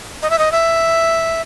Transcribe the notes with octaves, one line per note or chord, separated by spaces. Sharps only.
D#5
E5
D#5
E5